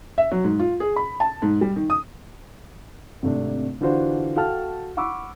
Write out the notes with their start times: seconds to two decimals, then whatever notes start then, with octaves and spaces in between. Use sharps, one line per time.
0.18 E5
0.31 F#3
0.44 G#2
0.59 F4
0.80 G#4
0.96 B5
1.20 A5
1.42 G#2
1.61 G3
1.76 D#3
1.90 D#6
3.23 G#1 C3 A3 D4
3.81 D3 E3 D4 F4 F#4 C5
4.36 F#4 A4 F5 G5 A5 F6
4.97 F#5 B5 C#6 D6 E6